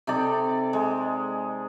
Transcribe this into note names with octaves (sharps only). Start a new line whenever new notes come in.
C3 D#4 A4 D5
G#3